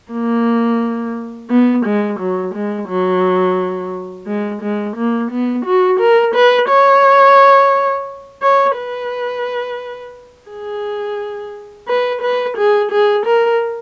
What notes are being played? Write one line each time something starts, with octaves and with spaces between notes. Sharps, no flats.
A#3
B3
G#3
F#3
G#3
F#3
G#3
G#3
A#3
B3
F#4
A#4
B4
C#5
C#5
B4
G#4
B4
B4
G#4
G#4
A#4